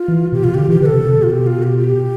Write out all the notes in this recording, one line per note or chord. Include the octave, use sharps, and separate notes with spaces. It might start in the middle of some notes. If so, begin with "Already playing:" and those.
Already playing: F4
E3
B2 G4
B2 F4
D3 G4
E3 G4
D3 B4
A4
C3
C3
B2
F4
G4
F4
G4
G4